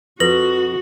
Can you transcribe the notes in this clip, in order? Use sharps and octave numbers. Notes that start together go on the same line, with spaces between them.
F2 F#4 B4 A#6 F#7